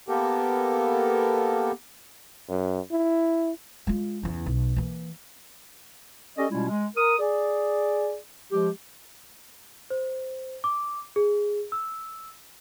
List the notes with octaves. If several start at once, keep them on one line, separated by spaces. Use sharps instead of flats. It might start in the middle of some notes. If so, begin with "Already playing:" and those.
A#3 B3 G4 A4 A#4
F#2
E4
G#3 F4
E2 C#3
B1
E3 A#3
C#4 G4 A4 D5 D#5
B2 G3 G#3 C#4 E4 F4
G#3
A#4 D#6
G#4 D5
F3 G#3 G4
C5
D6
G#4
E6